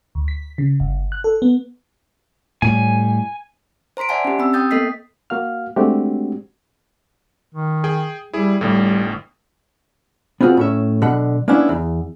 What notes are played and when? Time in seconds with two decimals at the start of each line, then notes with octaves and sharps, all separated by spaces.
0.15 D2
0.28 B6
0.58 C#3
0.80 G1
1.12 F#6
1.24 A4
1.42 B3
2.62 A2 G3 G#5
3.97 C5 A#5 C6 B6 D7
4.09 D5 E5 F#5 G#5 A5
4.25 C#4 G4
4.39 C4 B5 E6
4.53 G5 D#6 G6 A6
4.71 A#3 B3 A4 D#5 B6 C7
5.30 A#3 F#4 F5 F6
5.76 G#3 A3 C4 D4 F#4 G4
7.55 D#3
7.84 G#4 G5
8.33 G3 E4 G#4
8.61 G1 A2 G3
10.41 B3 C4 F4 F#4 G#4
10.57 A2 C#4 E5
11.02 B2 D3 F#3 F#5
11.48 A#3 B3 C#4 D4 E4
11.69 E2